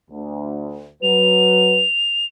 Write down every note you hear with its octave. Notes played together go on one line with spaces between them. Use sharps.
D2
F#3 B4 F7